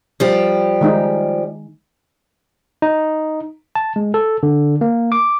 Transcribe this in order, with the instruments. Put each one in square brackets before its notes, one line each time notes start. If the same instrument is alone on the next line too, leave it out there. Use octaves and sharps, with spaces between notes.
[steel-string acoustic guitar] F3 G3 G4
[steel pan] D#3 G#3 D#4
[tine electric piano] D#4
A5
G#3
A4
D3
A#3
D6